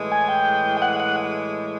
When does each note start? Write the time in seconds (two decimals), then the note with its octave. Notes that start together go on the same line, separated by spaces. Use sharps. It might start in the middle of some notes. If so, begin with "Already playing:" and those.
Already playing: A2 E3 G#3
0.12 G#5
0.29 G5
0.82 F#5
1.00 F#5